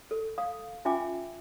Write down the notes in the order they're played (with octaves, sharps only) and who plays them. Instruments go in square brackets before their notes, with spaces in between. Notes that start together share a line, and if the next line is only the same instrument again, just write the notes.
[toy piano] A4
F5 D#6
C#4 F4 E5 G5 G#5 D6